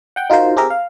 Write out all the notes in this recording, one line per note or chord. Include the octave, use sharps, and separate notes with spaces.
F#5 G5
D#4 F4 F#4 A#4 C5
C4 G4 G#4 A#4 E5
F5